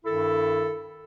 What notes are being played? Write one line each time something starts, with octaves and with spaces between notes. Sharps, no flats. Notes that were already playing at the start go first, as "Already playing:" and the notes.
G2 D#3 E4 A4